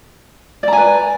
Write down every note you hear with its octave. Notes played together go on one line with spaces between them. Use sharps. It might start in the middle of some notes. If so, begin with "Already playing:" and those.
B4 D5 G#5 A#5